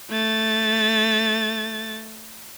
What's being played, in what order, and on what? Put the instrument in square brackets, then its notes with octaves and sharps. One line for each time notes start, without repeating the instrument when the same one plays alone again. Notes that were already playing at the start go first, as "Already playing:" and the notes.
[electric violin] A3 A6